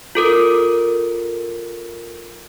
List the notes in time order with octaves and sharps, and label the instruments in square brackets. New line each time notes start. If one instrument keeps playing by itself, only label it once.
[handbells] F4 A4 A#4